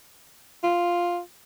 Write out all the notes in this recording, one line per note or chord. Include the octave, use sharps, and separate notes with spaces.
F4